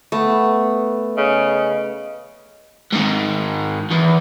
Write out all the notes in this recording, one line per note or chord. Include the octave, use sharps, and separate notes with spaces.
A3 B3
C#3 D#5
G#2 D#3
E2